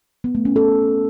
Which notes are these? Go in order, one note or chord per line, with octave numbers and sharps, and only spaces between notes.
B3
A3
C#4
A4